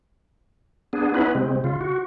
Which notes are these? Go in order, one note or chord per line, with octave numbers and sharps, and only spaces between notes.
B3 D4 G#4
B3 C#4 D#4 E4 B4
C3 G#3 C4
C#3 F4
F#4